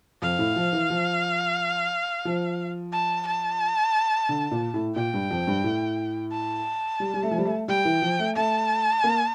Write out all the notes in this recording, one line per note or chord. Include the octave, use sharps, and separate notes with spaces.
F2 F5
A2
F3
E3
F3
F3
A5
A5
D3
A#2
A2
A#2 G5
G2
F2
G2
A2
A5
G3
G3
A3
F3
G3
A3
G3 G5
E3
F3
A3
A3 A5
A#3